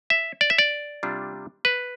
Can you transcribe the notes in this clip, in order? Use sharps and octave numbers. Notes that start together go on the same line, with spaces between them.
E5
D5
E5
D5
C3 G3 D4 F4
B4